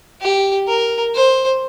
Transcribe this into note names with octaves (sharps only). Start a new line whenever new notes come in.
G4
A#4
C5